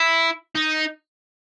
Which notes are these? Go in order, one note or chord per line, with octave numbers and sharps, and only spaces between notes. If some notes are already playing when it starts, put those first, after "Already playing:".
Already playing: E4
D#4